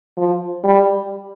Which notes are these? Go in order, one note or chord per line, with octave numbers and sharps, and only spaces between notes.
F3
G3